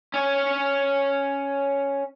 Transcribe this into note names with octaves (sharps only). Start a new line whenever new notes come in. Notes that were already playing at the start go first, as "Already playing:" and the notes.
C#4 C#5